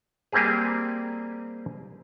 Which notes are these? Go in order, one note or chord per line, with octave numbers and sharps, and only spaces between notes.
G3 A#3 C4 G4 G#4